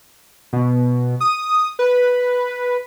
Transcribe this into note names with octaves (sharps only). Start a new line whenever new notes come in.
B2
D#6
B4